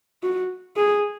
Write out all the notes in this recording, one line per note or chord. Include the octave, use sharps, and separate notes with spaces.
F#4
G#4